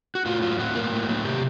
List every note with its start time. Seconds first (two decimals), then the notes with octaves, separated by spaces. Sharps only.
0.15 F#4
0.26 A2 F4
0.42 F#3 F4
0.59 A2 F#4
0.75 A#3
0.92 A2
1.08 F#3
1.25 C3 G4